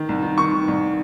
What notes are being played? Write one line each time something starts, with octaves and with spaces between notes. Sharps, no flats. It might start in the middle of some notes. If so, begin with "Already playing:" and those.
Already playing: D#3
C2
D#3
D#3 C#6
D#3
C2